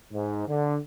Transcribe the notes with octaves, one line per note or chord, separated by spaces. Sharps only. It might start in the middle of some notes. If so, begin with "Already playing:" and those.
G#2
D3